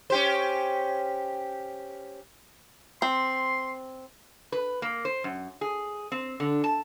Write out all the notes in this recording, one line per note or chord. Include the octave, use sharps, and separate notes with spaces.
C#4 G4 C5
C4 C6
B4
A#3
C5
F#2
G#4
C4
D3
A5